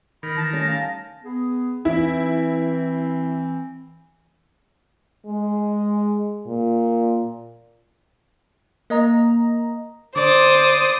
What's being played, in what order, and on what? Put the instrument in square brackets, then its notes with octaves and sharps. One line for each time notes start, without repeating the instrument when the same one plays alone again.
[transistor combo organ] D#3 A#4 [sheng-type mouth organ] B5
[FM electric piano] E3 [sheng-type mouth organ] A5 [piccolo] A#6
[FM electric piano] G3 A3 C#4
F5 G#5
[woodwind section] B3 G#4
[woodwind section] E3 C4 [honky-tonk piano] E4
[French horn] G#3
A#2
[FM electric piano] A#3 D#5 A#5
[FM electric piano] D3 [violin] C5 D#6 [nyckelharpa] D5